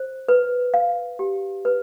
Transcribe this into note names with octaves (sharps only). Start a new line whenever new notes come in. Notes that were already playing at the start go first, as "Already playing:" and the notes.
Already playing: C5
B4
F5
G4
B4